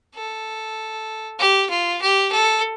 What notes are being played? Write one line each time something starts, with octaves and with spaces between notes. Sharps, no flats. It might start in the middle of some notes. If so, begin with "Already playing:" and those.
A4
G4
F4
G4
A4